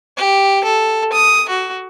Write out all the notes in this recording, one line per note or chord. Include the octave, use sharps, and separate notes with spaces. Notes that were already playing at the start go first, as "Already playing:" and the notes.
G4
A4
D#6
F#4